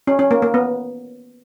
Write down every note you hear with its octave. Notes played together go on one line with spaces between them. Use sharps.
C#4
C#4
A#3
A#3
B3